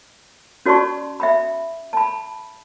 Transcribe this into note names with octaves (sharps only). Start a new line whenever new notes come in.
C#4 F#4 D5 A5 C6 C#6
E5 G5 B5
A5 B5